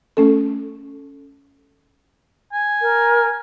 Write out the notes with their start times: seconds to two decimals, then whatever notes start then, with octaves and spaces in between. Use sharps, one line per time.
0.17 A3 C#4 A4
2.53 G#5
2.81 A#4